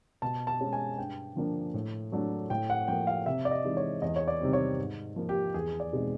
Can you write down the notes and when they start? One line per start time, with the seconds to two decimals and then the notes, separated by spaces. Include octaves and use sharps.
0.22 B2 A5
0.47 A5
0.60 G#3 C#4
0.73 G#5
0.98 G2 G5
1.36 D3 F3 A#3 D4
1.74 A2
2.12 F#3 A3 D4
2.50 A2 G5
2.70 F#5
2.88 F3 A#3 G5
3.07 F5
3.26 C3 E5
3.45 D5
3.51 D#5
3.64 E3 G#3 C4 D#4
3.77 C#5
4.02 E2 D#5
4.16 C#5
4.28 D5
4.41 C3 D#3 G3 C4
4.53 C#5
4.78 G#2
5.16 F3 A#3
5.29 G4
5.54 E2 G#4
5.80 D5
5.92 B2 G#3 C4 D#4